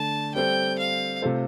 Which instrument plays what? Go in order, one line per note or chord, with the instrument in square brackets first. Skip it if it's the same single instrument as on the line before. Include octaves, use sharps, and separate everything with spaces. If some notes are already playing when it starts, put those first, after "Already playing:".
Already playing: [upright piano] D3 A3 D4 [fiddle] A5
[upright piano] G3 C4 A4 C5 [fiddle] G5
[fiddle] F5
[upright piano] C3 A3 F4 A4 C5